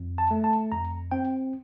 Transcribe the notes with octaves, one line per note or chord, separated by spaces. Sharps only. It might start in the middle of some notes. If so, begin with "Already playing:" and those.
Already playing: F2
A5
A3
A5
F2 A#5
C4 G5